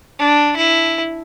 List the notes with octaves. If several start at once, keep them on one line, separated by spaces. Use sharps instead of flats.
D4
E4